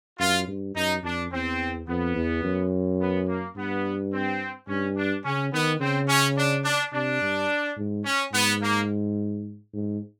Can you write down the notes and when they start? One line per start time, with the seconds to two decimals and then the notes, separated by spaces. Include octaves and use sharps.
0.19 F#2 F4
0.48 G2
0.76 F#2 D#4
1.03 F2 D4
1.32 E2 C4
1.88 F2 B3
2.16 E2
2.44 F#2
3.01 B3
3.28 A#3
3.56 G2 B3
4.13 C4
4.68 G2 C#4
4.97 D4
5.25 C#3 C#4
5.53 D#3 B3
5.80 C#3 C4
6.08 C#4
6.37 D4
6.64 D4
6.93 C3 D4
7.21 G2
7.77 G#2
8.05 C#4
8.33 G#2 B3
8.62 A#3
9.74 G#2